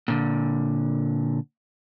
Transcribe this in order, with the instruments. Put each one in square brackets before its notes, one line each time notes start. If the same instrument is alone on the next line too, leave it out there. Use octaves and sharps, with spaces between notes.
[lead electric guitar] A#2 D3